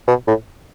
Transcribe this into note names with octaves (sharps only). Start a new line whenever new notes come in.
B2
A2